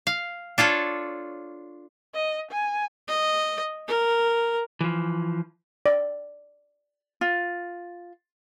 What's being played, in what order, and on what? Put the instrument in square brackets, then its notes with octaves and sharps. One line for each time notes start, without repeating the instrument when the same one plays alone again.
[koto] F5
D4 F4 A4 C#5
[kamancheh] D#5
G#5
[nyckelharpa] D#5
A#4
[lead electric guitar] E3 F3
[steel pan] D5
[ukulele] F4